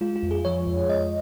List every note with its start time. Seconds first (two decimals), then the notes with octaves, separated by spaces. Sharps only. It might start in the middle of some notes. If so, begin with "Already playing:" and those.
0.01 G#3 F4
0.16 F4
0.23 F2
0.31 G#4
0.45 F3 C#5
0.67 F2
0.89 G#3 D#5